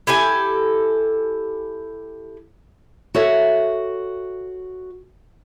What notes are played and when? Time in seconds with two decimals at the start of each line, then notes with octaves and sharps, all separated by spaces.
0.07 E4 G4 A4 G#5
3.15 F#4 A4 C#5 E5